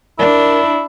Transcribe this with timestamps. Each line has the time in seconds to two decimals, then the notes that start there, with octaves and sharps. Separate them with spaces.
0.19 D4 E4 A#4